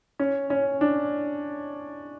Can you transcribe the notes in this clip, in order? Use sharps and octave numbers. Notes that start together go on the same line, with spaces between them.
C#4
C#4
D4